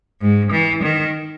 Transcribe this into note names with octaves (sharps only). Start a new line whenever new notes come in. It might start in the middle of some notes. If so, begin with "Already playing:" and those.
G#2
E3
D#3